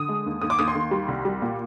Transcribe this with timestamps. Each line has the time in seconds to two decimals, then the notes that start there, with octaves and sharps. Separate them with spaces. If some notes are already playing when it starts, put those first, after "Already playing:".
Already playing: D3 D#6
0.09 G#3
0.26 D#2
0.42 D#2 D#6
0.50 D6
0.59 D#2 D#6
0.68 C6
0.75 D#2
0.91 G3
1.08 C2
1.25 G3
1.42 A#2